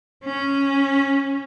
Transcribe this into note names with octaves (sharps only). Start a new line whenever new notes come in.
C#4